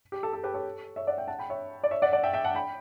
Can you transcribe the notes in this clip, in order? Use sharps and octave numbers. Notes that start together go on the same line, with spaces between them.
G4
A4
A4
G4 B4
A4 C#5
C#5 E5
D5 F#5
E5 G5
F#5 A5
G5 B5
C#5 E5
D5
C#5 E5
D5 F#5
D5 F#5
E5 G5
E5 G5
F#5 A5
G5 B5